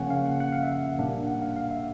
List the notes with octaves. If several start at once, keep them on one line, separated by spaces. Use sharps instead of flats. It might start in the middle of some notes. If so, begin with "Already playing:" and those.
Already playing: C#3 F3 A#3 C#4 F#5
F5
F#5
F#5
F5
E5
F5
A#2 G3 A#3 D4
F#5
F5
F5
E5